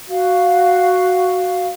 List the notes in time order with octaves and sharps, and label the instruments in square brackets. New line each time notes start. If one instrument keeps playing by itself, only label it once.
[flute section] F#4 F5